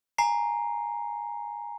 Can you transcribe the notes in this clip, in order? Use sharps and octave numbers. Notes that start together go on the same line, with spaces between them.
G#5 A#5 C7